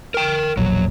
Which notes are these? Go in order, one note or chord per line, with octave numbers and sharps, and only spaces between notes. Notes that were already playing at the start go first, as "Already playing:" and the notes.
A#4 G5
E1 A#1 F#3